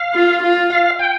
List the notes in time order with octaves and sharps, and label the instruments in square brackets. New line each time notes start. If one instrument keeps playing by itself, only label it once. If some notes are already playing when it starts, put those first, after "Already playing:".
Already playing: [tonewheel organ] F5
[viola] F4
F4
[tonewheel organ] F5
G5